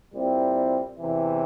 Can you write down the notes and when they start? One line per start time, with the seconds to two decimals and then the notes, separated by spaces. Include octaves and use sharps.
0.13 A#2 G3 C4 E4
0.99 E2 C3 E3